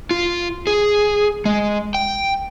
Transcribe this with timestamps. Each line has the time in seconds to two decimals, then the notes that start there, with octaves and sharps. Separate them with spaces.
0.11 F4
0.67 G#4
1.45 G#3
1.95 G5